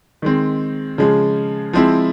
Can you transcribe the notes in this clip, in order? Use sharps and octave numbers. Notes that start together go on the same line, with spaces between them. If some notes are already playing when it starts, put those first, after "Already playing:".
D#3 G#3 C4
C#3 F3 G#3
F3 G#3 C4 E4